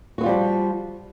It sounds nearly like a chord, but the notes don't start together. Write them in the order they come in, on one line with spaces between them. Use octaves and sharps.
F#4 B3 F4 G3 F3